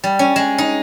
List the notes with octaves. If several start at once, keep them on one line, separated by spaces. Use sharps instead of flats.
G3
C#4
G#3
D#4